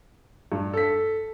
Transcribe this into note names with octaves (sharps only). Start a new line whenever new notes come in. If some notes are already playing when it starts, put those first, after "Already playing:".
G2
A4 B6